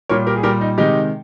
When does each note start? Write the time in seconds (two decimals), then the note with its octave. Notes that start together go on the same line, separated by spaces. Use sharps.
0.09 A#2 G3 A#4 C#5
0.27 G4 A#4
0.36 G#4
0.43 A#2 G3 G4 A#4
0.61 D#4
0.78 C3 D#3 G#3 D#4 G4